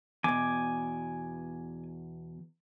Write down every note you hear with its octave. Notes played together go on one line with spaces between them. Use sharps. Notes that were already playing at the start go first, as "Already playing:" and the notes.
E2 B2 G#5 D6